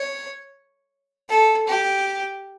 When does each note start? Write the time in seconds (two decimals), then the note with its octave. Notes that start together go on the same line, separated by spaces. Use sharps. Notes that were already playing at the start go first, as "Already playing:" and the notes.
Already playing: C#5
1.29 A4
1.68 G4